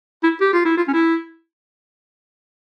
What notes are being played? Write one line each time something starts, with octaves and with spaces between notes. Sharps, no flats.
E4
G4
F4
E4
F4
C#4
E4